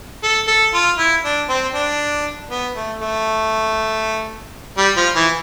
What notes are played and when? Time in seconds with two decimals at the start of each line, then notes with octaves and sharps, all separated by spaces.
0.23 A4
0.48 A4
0.74 F4
0.98 E4
1.24 D4
1.49 C4
1.74 D4
2.50 B3
2.75 A3
3.01 A3
4.77 G3
4.96 F3
5.15 E3